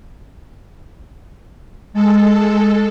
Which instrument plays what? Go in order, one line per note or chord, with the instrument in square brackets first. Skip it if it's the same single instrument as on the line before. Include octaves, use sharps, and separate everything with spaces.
[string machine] G#3 A4